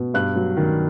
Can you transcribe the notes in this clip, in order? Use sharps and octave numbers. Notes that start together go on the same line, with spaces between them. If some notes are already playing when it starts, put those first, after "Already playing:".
Already playing: B2
G2 F#6
F#3
D#3